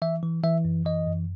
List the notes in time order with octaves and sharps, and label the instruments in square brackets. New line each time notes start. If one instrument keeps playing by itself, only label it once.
[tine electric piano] E3 E5
E3
E3 E5
F#2
E3 D#5
F#2